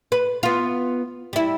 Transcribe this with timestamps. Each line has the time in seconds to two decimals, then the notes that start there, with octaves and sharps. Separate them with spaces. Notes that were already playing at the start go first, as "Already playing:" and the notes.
0.12 B4
0.43 B3 F4
1.33 G3 E4